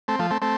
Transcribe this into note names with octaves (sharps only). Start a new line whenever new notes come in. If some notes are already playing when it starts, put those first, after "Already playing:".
A3 C4
F3 A3
A3 C4
A3 C4